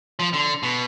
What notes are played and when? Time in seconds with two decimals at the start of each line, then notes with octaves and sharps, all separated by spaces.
0.19 F3
0.33 D3
0.63 B2